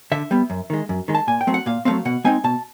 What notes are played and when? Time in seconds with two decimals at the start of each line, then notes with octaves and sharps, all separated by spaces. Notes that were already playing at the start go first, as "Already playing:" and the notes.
0.12 D3 E5
0.31 G3 B3
0.50 F#2
0.70 D#3 G#3
0.89 F#2
1.08 D#3 G#3
1.15 A5
1.27 A#2 G#5
1.41 G5
1.47 F#3 A3 C4
1.54 F#5
1.66 A#2 F5
1.85 F#3 A3 C4 F5
2.05 B2 F#5
2.24 G#3 C4 D#4 G#5
2.44 B2 A5